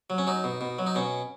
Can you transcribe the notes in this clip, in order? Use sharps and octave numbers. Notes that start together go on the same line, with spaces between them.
F#3
C#4
F#3 D#4
B2
B2
F#3
D#4
B2 C#4